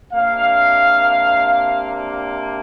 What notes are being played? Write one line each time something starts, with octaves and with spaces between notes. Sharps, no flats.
C3 A#3 D4 F5